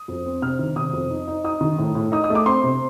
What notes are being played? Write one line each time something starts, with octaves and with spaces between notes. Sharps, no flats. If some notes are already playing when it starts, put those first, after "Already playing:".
Already playing: D#6
F2
C4
C3 F6
D#3
C3 D#6
F2
D#4
D#4
D#4 D#6
D#3
A2
A2
D#4 D#6
D#6
A3
D6
C4 C6
C3